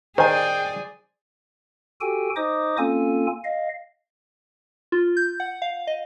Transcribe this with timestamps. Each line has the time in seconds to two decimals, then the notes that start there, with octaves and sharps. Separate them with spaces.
0.18 D#3 G#4 C5 D5 G5 G#5
2.01 F#4 G4 A4 G5 G#5
2.36 D#4 C5 D#5 D6 D#6
2.78 A#3 C4 C#4 F4 A4 G#5
3.44 D#5 F5
4.92 F4
5.17 G6
5.40 F#5
5.62 F5
5.87 D#5